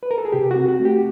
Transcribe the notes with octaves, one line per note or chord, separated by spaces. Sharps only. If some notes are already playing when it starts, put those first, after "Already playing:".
B4
A#4
A4
G#4
C3 G4
C4 F#4
F#4
A3
G4